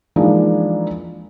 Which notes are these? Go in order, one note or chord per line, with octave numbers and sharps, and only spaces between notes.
E3 F3 G#3 A#3 D4 D#4